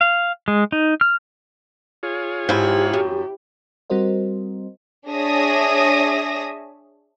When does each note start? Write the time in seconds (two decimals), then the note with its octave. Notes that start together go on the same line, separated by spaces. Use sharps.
0.01 F5
0.48 G#3
0.72 D#4
1.01 F6
2.03 F4 G#4 C#5
2.49 G#2 E4 G4
2.93 F#2
3.90 G3 C4 F#4 A#4 C5 D#5
5.09 D4 G#4 C#5 E5 D#6 A#6